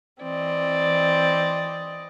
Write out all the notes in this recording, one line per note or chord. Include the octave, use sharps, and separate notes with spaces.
E3 C4 D5 D#5